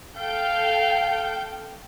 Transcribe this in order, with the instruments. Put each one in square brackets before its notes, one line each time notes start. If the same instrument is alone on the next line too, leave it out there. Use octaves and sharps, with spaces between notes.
[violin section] A4 G5 G6 [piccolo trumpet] F5